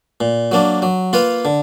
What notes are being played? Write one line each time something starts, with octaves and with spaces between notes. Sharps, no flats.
A#2
F#3 A#3 D4
F#3
A#3 F4 B4 F5
D3